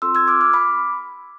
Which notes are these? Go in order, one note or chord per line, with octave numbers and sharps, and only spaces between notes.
C4 F4 A4 C6 E6
E6 G#6
D6 F6
D6 F6
B5 D6